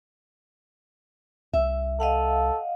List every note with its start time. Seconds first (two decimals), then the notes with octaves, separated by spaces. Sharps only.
1.53 C2 E5
2.00 A4 D#5 F5 F#5